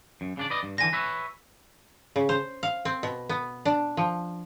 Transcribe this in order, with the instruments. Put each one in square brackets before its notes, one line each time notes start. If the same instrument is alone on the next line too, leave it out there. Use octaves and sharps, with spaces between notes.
[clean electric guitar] F#2
C#3 D4 D5
B4 D5 D#5
G2
[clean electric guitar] D3 E3 [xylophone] G#5 A#6
[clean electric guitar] B4 C#5 E5
[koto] C#3
C5
F5
C4
B2
B3
D4
F3